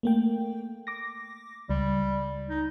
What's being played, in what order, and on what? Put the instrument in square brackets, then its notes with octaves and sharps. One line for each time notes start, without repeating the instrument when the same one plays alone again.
[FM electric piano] A3 A#3 G5
D6 A#6
[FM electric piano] C#2 [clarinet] G3
[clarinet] D#4